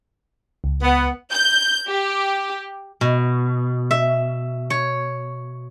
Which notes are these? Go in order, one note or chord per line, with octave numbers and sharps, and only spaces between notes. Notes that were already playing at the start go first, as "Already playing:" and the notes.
C#2
B3
G6
G4
B2
E5
C#5